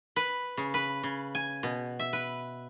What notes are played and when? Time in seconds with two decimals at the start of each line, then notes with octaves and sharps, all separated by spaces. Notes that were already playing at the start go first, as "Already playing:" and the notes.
0.16 B4
0.57 C#3
0.74 B4
1.03 C#3
1.35 G#5
1.63 B2
1.99 E5
2.13 B4